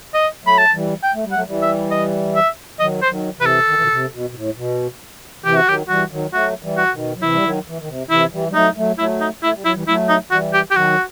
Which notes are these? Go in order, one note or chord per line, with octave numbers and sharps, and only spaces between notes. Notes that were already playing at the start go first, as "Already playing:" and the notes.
D#5
F#3 A3 B5
A5
E3 G3
G5
A3
G3
F#3 A3 F#5
E3 G3
E5
D#5
E5
D#3 F#3 D#5
C5
D#3 F#3
C3 E3 B4
A4
D#3
E3
B2 D#3
C3
B2
B2
A2
B2
C3 E3 G4
F#4
D#3 F#3 G4
E3 G3 F#4
D#3 F#3
F#3 A3 F#4
E3 G3
F#4
B2 D#3
F#3
C3 E3 E4
G3
D#3 F#3
E3
D#3
C3
C3 E3 E4
E3 G3
G3
F#3 A3 D#4
F#3 A3
F#3 A3 E4
D#4
A3 E4
G3
F#3 E4
E3 G3
F#3 A3 E4
D#4
E3 G3 F#4
G4
G4
D#3 F#3 F#4